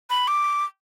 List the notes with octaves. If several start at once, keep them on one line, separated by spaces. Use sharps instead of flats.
B5
D6